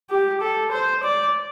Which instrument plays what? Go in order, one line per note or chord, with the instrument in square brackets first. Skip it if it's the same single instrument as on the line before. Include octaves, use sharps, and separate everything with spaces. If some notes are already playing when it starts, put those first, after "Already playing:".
[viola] G4
A4
C5
D5